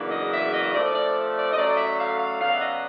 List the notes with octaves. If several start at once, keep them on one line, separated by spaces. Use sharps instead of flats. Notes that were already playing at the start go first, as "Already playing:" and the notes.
Already playing: E2 C#3 F#3 A#3 D4
D#5
E5
D#5
C3 F3 A3 D5
D5
D5
D#5
D3 F#3 A3 C#4 D5
D#5
E5
F5
F5
C#3 F#3 B3 D4 F5
E5
D#5